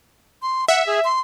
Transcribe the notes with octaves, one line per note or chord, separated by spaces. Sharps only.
C6
E5 F#5
G#4
C6